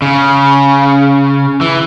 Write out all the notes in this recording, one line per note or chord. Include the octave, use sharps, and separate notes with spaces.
C#3
E3